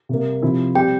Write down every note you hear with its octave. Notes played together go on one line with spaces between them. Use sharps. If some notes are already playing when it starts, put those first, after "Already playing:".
C3 G3 A#3
C3 F3 C4 E4
G3 C4 G4 G5